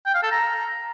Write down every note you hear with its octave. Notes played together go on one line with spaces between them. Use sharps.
G5
F5
A4
A#5